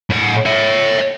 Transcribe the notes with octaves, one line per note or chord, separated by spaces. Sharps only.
A2 F#5
C#5 E5